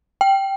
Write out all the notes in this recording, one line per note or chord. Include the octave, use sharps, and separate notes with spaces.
G5